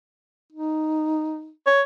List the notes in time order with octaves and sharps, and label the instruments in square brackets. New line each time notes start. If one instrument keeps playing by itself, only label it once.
[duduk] D#4
[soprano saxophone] C#5